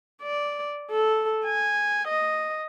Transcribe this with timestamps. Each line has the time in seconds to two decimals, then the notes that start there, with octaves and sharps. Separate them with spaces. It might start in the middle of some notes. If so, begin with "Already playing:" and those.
0.23 D5
0.91 A4
1.45 G#5
2.08 D#5